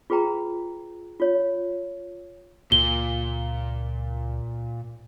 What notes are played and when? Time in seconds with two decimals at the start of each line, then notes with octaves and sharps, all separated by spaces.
0.10 F4 G#4 B4 G5 A#5
1.20 F4 C#5
2.72 C#2 A#2 G7